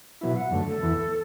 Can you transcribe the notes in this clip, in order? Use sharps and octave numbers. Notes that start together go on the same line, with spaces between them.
B2 F#3 B3 E4 E5
F#5
F#2 D3 A3
A4
E2 E3 B3